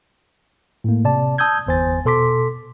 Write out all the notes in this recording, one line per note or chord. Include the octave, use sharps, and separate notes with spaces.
A2 A#3
C3 D5 A5
A5 D#6 E6 G6 G#6
G1 E2 C5 G#5 A6
B2 A4 C6 D6 B6